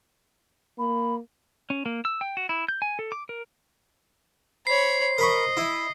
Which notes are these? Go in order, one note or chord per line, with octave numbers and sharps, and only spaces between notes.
A#3 B5
C#4
A#3
E6
G5
F#4
E4
G6
G#5
A4
D6
A#4
C5 C#5 B5 C7
A#4 D#5 B5 C#6
E4